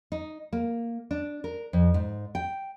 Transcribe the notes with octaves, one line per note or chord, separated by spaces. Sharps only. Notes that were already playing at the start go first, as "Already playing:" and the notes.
D#4
A#3
D4
A#4
F2
G#2
G5